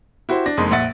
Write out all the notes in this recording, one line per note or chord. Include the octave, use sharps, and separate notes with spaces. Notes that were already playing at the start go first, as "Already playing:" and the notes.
E4 F#4 G4 C5
D4 A#6
F#1 F2 G#3 D#4 C6
A#1 E5 F#5 A6